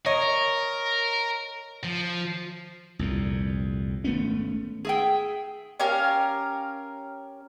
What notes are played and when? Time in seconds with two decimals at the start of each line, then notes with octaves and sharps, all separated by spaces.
0.06 A#4 C#5 D#5
1.84 F3
2.99 C2 F2 A#2
4.04 G#1 A3 B3 C#4
4.85 G#4 E5 G5
5.80 C#4 G4 A#4 F5